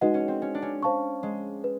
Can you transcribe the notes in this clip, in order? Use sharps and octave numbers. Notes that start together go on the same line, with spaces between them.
G#3 D#4 F#4 B4 D#5 F#5
C#4
C4
C#4
D4
C#4
C5 F5 A5 C#6
G#3
B4